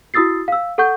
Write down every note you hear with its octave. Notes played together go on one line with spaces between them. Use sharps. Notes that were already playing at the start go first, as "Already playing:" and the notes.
E4 F#4 D#6 E6 A6 C7
F5 E6
A4 F#5 C#6 G6